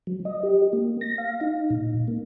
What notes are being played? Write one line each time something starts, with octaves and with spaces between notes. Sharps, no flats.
F#3
D#5
G4
A#3
A#6
F5
D#4
A#2
A#3